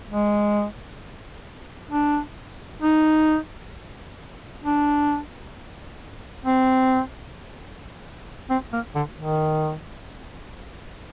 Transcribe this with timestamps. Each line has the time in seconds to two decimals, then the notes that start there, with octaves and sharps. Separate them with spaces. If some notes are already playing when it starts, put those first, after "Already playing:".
0.10 G#3
1.91 D4
2.82 D#4
4.64 D4
6.46 C4
8.50 C4
8.73 A#3
8.95 D3
9.18 D#3